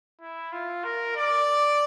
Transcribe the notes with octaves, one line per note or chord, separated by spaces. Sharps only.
E4
F4
A#4
D5